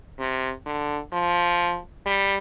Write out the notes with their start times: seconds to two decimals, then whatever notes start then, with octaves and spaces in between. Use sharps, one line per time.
0.19 C3
0.66 D3
1.13 F3
2.06 G3